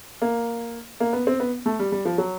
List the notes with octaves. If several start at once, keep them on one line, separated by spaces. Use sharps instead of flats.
A#3
A#3
B3
C4
B3
A3
G3
G3
F3
F#3